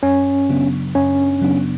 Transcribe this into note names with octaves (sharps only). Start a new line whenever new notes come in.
F#2 C#4
C#3 F#3 B3 D4
F#2 C#4
C#3 F#3 B3 D4